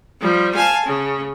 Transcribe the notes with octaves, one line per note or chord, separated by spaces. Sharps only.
F3 G3
F5 G#5 A5
C#3